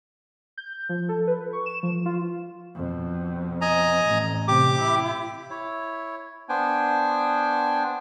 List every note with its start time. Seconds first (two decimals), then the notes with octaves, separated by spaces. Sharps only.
0.58 G6
0.89 F3
1.09 A4
1.27 B4
1.53 C#6
1.66 E7
1.83 F3
2.06 F4
2.75 F2 B2
3.61 D#5 G#5 A#5
4.07 A1
4.48 C3 G4 D6
4.80 E4
5.50 E4 C#5
6.49 B3 D4 C5 G5 G#5